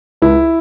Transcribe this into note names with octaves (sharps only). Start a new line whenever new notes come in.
C#2 E4